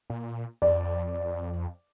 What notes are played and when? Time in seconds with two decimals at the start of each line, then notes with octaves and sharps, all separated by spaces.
0.10 A#2
0.62 F2 D5